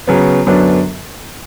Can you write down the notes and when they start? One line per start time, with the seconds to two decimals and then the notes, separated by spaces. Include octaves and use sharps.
0.07 C#3 F#3 B3
0.47 F#2 D3 F#3 B3 D4